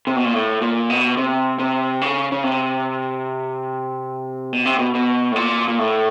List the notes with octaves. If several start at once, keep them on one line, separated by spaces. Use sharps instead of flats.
C3
B2
A#2
A2
A#2
B2
C3
C3
C#3
C#3
C3
B2
C3
B2
B2
A2
A#2
A#2
A2